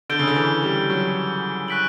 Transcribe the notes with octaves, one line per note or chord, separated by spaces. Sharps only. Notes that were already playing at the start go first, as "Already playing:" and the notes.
D3 G6 D7 G7
C#3
D3
E3
G3
F#3
C#6 F#6 B6 D7 F#7